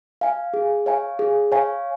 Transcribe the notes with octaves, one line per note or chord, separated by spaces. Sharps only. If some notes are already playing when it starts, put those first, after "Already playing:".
F5 G#5
G#4
C#5 F5 G#5
G#4
C#5 F5 G#5